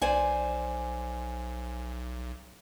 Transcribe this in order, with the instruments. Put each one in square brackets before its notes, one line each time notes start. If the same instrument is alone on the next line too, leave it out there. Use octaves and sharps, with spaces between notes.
[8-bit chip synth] B1 [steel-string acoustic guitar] C5 D5 G#5